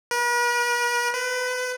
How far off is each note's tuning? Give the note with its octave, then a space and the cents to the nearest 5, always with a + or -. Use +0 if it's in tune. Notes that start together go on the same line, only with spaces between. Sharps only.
B4 -45
B4 +30